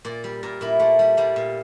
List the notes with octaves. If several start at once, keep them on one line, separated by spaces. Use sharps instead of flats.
A#2 D5
G3
A#2 A#4
A#2 E4
A#2 A3
G3
A#2 G3
A#2